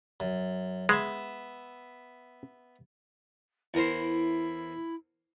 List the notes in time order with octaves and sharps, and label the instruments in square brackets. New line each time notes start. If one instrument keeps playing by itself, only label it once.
[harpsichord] F#2
[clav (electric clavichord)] G#3 [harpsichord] B3 E5
[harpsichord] E2 A#4 C5 [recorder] E4